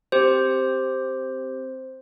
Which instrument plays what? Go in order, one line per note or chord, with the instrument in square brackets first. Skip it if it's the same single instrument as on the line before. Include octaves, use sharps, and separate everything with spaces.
[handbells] C4 G4 C5